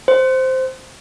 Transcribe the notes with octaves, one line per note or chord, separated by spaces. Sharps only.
C5